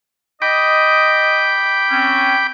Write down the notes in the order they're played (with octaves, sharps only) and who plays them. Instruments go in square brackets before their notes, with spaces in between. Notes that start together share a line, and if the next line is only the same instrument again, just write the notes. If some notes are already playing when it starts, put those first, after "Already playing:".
[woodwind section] D#5 [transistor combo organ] G5 B5 D6
[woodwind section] C4 C#4